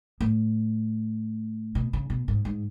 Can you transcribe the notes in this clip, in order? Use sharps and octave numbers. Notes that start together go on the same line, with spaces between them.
A2
B2
C#3
B2
G#2
G#2